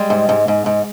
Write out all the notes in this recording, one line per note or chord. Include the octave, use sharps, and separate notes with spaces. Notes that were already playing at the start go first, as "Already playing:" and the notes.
Already playing: G3 G#3
G#2
G#2
G#2
G#2